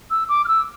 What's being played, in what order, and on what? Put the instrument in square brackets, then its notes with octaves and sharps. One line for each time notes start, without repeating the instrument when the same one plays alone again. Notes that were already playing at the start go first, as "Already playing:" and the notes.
[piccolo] E6
D6
F6
E6